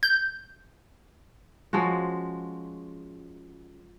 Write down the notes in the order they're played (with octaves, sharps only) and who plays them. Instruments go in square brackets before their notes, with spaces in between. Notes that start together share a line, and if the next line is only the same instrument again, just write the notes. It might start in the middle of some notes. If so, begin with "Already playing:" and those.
[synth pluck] G6
[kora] F3 G#3 C#4 F#4